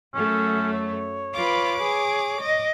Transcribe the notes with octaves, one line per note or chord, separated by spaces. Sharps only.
F#2 A3 C#4
C#5
F4 B4 D6
G#4
D#5